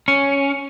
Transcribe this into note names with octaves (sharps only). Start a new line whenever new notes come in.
C#4